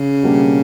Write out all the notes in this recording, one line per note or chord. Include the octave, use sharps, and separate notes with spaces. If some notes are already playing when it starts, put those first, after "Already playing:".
Already playing: C#3
B2 G3 A#3 D4 G4